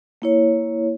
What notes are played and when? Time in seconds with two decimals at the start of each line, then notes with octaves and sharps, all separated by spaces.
0.22 A#3 E4 C#5